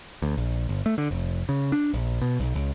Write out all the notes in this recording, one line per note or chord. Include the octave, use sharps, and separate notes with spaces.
D2
A#1
G1
A3
D3
F1
C#3
D4
A#1
B2
B1
C#2